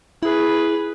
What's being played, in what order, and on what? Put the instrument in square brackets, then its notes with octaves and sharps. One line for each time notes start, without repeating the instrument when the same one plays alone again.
[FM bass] E4 [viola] G#4 B4